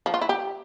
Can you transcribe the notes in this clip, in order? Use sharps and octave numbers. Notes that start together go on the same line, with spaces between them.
F3
F4
E4
G4